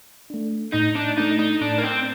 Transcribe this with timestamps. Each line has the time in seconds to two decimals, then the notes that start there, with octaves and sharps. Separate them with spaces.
0.30 A3 D4
0.73 A2 D#4
0.96 D4
1.18 A3 D4 D#4
1.39 D#4
1.61 A2 D4
1.78 A#3
1.83 C4